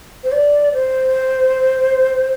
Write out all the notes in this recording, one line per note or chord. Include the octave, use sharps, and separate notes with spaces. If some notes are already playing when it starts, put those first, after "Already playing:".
C5
D5
C5